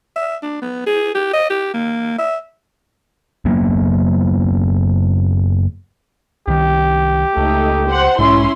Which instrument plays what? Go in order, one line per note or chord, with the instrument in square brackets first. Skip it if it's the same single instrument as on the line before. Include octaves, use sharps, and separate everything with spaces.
[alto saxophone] E5
D4
B3
G#4
G4
D#5
G4
A#3
E5
[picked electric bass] F#1 F#3 A#3 B3
[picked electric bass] C2 D#3 [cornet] G4
[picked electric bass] C#2 [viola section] A3 D#4
[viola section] C5 F#5
[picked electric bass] B1 G#2 G#3 [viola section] C#4 E4 C6